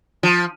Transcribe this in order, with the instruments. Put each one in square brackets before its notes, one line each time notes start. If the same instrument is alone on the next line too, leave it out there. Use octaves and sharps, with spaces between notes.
[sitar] F3